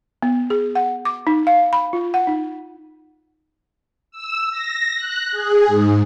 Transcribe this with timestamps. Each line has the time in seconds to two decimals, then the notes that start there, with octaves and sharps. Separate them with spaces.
0.23 B3
0.50 G#4
0.75 F#5
1.05 D6
1.27 D#4
1.47 F5
1.73 B5
1.93 F4
2.14 F#5
2.27 D#4
4.11 E6
4.51 A#6
4.96 F#6
5.31 G#4
5.67 G#2